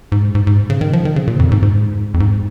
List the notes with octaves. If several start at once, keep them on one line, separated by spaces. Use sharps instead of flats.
G#2
G#2
G#2
C#3
D#3
F3
D#3
C#3
A#2
F2
G#2
G#2
F2
G#2